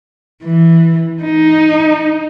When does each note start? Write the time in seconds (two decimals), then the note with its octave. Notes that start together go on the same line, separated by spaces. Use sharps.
0.44 E3
1.23 D#4